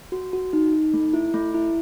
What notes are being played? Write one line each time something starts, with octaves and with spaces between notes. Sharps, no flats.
F#4
F#4
D#4
D#4
A3
E4
A3
E4